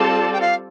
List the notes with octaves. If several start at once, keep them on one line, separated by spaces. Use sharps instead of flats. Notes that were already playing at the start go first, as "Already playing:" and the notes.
Already playing: G3 C4 F4 A4 D5 A5
G5
F5